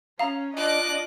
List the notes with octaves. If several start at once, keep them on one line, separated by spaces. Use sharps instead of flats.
C#4 F5 A#5
D4 F4 D#5 D6 F#6